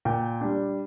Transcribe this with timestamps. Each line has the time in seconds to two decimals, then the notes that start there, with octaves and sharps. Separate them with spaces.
0.05 A#2 G5
0.41 G3 D4